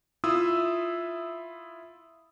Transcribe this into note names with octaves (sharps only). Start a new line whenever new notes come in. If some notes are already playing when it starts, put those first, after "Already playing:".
E4 F4 E5 D#6 E6